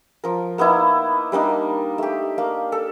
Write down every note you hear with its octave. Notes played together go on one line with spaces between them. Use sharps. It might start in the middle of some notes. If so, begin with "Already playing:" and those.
F3 A#4
A#3 B3 D#4 E4
G3 A#3 D4 D#4
A3 G4
A#3 F5
A4